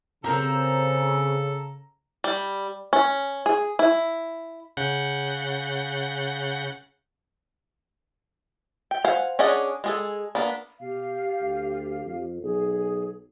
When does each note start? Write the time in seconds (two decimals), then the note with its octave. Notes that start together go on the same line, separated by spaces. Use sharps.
0.24 C#3 C4 G4 A4 A#4 A#5
2.24 G3
2.93 C#4
3.46 G#4
3.79 E4
4.77 C#3 F#5 G6
8.91 G5
9.05 C5 F5 F#5 G#5
9.39 C#4 D4 G#4 D#5 F#5
9.84 G#3 G#4 A4
10.35 A#3 B3 D4
10.80 B2 G4 F5
11.41 D2
12.06 F2
12.43 B1 G#4